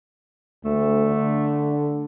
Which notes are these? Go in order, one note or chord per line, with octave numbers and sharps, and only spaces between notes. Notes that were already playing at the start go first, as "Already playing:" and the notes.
D2 A3
D3